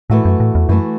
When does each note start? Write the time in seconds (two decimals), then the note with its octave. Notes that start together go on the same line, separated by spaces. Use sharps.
0.10 A2 E3 A3 F#4
0.25 F#2
0.40 A2
0.55 E2
0.69 F#2 E3 A3 F#4